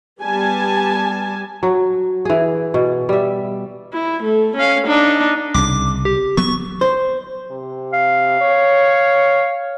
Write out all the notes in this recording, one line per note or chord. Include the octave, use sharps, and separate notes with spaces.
G3 B3 G#5 A5
F#3
E3 G#4
B2
G3 E5
E4
A3
C#4 F5
D4 D#4
C2 C#3 D6
G4
F#3 B3 C#6
C5
C3
F5
C#5